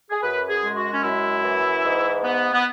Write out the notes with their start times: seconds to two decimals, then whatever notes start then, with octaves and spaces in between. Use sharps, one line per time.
0.11 G#4
0.23 F#2 B4
0.50 G#4
0.63 G#3
0.76 F#4
0.93 C#4
1.03 F#2 E4
1.44 E3
1.84 G#2
2.25 B3
2.54 B3